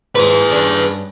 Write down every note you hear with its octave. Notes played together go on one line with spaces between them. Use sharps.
G#2 G#4 B4
G2 C#4 D4